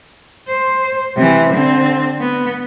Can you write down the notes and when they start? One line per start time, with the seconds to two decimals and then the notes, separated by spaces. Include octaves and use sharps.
0.48 C5
1.16 C3 E3
1.52 D3 C4
2.21 B3